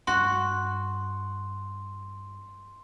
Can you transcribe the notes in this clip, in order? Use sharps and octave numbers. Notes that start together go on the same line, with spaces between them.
G2 F#4 C6